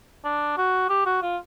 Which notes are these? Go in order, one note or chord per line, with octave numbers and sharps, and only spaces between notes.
D4
F#4
G4
F#4
F4